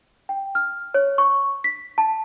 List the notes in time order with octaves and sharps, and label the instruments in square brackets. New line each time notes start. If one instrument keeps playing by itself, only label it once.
[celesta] G5
F6
C#5
C#6
B6
A5